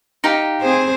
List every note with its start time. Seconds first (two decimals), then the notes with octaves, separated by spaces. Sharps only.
0.24 D#4 G4 F5
0.61 C4 G#4 C5